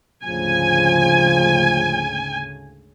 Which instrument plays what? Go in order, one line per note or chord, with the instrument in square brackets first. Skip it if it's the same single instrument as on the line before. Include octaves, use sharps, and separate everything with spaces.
[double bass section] D2 G#2 C#3 [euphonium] F3 [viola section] G#5